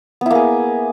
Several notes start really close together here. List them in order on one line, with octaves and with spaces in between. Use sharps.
B3 E4 A#3 G#4